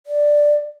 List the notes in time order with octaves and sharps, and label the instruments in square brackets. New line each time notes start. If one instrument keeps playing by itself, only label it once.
[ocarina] D5